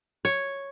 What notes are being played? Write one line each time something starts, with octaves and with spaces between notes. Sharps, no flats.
C#5